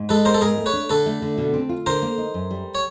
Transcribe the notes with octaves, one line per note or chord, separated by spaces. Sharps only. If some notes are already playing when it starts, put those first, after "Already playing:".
Already playing: G#2
G#3 A4 B4
B3 A#4 C5
A4
G#2 G#4 A#4
A3
B4 C#5
D4
D3 A4 B4
A3
D3
B2
C4
F4
D3 A#4 C5
A#3
D#4
F#2
G3
C#5